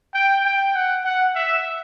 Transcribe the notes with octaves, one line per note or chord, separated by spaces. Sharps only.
G5
G5
F#5
F#5
E5